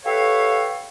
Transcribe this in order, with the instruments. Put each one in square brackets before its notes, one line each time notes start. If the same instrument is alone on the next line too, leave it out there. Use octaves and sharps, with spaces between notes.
[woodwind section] G4 A4 B4 C#5 E5 F5